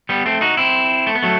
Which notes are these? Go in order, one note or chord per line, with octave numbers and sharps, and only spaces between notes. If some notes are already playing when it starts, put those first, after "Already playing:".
G3 B3
A3 C4
D#4 F#4
C4 E4
A3
B3
F#3 A3